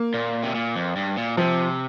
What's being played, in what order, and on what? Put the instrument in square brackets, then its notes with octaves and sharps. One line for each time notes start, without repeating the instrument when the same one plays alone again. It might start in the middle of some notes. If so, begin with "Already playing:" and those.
Already playing: [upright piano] A#3
[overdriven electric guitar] A#2
C3
A#2
F2
G2
A#2
[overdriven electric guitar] C3 [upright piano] F3